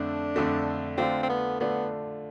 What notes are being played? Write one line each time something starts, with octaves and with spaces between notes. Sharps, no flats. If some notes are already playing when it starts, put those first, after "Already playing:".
Already playing: F2 D3 A3 D4
F2 D3 A3
D3 A3 C4 D4 F4
C4
B3
D3 A3 B3 D4 F4